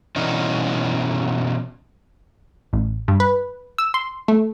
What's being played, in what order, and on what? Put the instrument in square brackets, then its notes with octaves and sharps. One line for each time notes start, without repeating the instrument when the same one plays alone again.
[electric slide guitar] B2 E3 C#4 D#4
[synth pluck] A1
G2
B4
E6
C6
A3